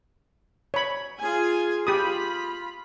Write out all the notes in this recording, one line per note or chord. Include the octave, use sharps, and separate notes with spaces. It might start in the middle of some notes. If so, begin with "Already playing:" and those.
C#5 B5
F4 G#4 G#5
F4 G4 B5 D#6